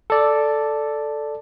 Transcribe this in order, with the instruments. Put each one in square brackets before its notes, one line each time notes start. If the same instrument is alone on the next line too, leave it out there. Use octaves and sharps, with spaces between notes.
[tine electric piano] A4 D5